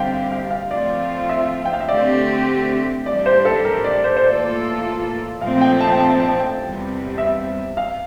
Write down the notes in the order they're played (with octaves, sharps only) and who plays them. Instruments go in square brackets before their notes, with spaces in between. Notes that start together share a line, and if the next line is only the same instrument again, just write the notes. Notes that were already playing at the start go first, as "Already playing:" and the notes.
Already playing: [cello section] D3 G3 C4 G4 [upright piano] F5 G5
[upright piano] F5
F5
[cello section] F3 A3 C4 F4 [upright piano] D5
[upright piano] E5
G5
F5
E5
[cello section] D3 A3 C4 G4 [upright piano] D5
[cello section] A2 E3 G3 D4 G4 [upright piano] D5
[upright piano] C5
A4
A#4
D5
C5
C5
[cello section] A2 E3 A#3 F4 A4 [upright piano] D5
[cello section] A#2 F3 A3 C4 [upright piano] F5
[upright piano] G5
A5
G5
A5
A5
G5
[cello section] E2 C3 G3 C4
[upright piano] E5
F5